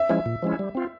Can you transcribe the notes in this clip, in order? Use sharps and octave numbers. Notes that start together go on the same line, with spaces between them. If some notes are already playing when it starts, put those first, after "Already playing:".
Already playing: E5
F3 G#3 C#4 E4
A#2
F3 G#3 C#4 E4
G3
C4 F4